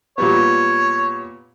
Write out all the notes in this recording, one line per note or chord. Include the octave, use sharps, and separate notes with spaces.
A#2 G3 B3 C#5